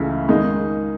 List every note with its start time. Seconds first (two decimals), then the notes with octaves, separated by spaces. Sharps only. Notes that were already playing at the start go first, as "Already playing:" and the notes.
Already playing: C#2 C#3 E3 A3
0.29 D#3 G#3 D#4